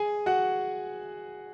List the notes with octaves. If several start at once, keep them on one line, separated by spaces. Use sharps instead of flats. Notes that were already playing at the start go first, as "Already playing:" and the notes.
Already playing: G#4 G#5
F#4 F#5